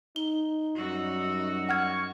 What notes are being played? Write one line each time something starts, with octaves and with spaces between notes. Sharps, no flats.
D#4 G7
F#2 G3 D#4 F#4 E6
F#5 C#6 F6 G#6